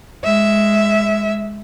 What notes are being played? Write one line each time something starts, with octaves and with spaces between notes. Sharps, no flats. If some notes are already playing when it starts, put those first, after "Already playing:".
G#3 E5